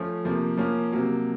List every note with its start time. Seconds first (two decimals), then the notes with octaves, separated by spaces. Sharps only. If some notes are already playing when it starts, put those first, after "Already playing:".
Already playing: F3 A3 C#4
0.25 C3 F3 A#3
0.57 F3 A#3 C#4
0.92 C3 F#3 A#3